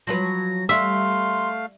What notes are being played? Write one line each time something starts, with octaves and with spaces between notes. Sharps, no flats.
F3 F#3 B4 A#6
G3 A3 E5 F5 C6